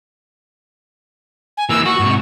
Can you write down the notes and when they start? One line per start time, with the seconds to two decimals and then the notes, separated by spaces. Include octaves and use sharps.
1.57 G#5
1.69 E3 A#3 E6
1.86 F#4 C#6
2.00 G#2 C3